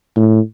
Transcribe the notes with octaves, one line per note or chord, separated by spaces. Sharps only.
A2